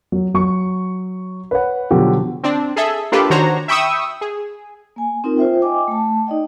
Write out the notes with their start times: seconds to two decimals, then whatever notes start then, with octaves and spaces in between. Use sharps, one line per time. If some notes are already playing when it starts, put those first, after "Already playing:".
0.12 F#3
0.34 F#3 C#6
1.51 B4 C#5 F#5
1.91 B2 D3 F3 F#3 F#4 G4
2.43 C4 D4
2.76 G#4 A4 E5
3.12 A#3 D4 F4 G4 A4 B4
3.30 D#3 D4 F#4 C5 C#5 A#5
3.68 E5 G5 B5 C#6 D#6 E6
4.21 G#4
4.96 A#3 G#5
5.24 C4 D#4 F4 A#4
5.37 F4 C5 E5 G5
5.62 D#5 G5 G#5 D6
5.88 A3 A5
6.27 D#4 D5 D#5 G5